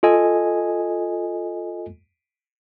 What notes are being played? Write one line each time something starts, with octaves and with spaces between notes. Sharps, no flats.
F4 A4 D#5 G#5